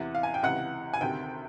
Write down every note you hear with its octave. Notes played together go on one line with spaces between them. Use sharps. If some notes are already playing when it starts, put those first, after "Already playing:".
Already playing: E2 C3 E3 F#5
F5
G#5
G5
C#2 C3 E3 F#5
G#5
D2 C3 D#3 G5